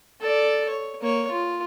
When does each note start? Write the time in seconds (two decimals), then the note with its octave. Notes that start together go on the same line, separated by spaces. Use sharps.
0.21 A4 D5
0.69 C#5
1.01 A#3 C#5
1.31 F4